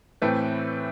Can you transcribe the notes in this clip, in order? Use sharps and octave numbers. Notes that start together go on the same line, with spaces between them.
A2 E3 A3 C4 B4